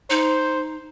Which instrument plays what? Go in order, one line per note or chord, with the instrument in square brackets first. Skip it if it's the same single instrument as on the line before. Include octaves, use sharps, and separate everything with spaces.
[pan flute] D#4 [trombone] C5